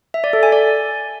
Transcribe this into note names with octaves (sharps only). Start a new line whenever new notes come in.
E5
D5
A4
G#5
D5